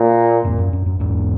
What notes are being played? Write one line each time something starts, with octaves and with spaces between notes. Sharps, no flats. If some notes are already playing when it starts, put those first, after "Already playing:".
Already playing: A#2
E2 G#2
F#2
F#2
F#2
E2 G#2